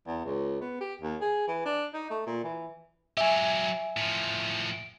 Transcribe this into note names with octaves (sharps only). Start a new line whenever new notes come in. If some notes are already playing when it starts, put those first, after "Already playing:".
E2
C#2
B3
G4
D#2
G#4
E3
D4
D#4
A3
A#2
E3
F#3 G4 E5 G#5
A2 F3